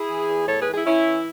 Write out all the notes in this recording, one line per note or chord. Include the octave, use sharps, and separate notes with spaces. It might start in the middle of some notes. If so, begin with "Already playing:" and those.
Already playing: E4 G#4
E3
E2
A2 A4 C#5
G#4 B4
E3
E4 G#4
E3 C#4 E4
E3